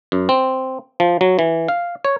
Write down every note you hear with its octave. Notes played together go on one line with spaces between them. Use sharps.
F#2
C4
F3
F#3
E3
F5
C#5